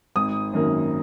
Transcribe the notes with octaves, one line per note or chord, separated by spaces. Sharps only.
G#1 D#6
F#2 D#3 A#3